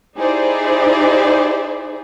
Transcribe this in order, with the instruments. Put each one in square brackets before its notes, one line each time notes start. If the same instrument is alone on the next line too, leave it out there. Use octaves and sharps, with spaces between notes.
[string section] D#4 E4 G4 G#4 C5 D5